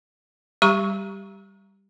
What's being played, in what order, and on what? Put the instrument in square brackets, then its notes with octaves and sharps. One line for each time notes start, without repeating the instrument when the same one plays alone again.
[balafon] G3 G4 A#5 C#6